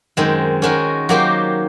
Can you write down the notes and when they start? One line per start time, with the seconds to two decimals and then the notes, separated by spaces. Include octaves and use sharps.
0.17 F#2 D#3 G#3 C4
0.62 D#3 G#3 C#4 F#4 A#4
1.09 F#3 A#3 D#4 G4 C5